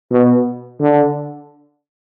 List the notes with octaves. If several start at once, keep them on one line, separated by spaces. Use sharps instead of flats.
B2
D3